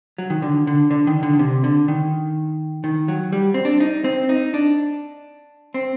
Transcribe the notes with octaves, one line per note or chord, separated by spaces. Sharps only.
F#3
D#3
D3
D3
D3
D#3
D3
C3
D3
D#3
D#3
F#3
G3
C4
D4
D#4
C4
D#4
D4
C4